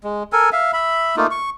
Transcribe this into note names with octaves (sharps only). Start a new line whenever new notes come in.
G#3
A4 A#4 G#5
E5 F5
E5 B5
A3 A#3 D#4 F4
C#6